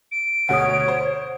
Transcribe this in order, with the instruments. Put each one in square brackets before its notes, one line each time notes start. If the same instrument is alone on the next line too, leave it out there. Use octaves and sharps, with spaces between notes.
[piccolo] D7
[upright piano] D2 B2 [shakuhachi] C#5 [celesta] F#5 D#6
[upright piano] C5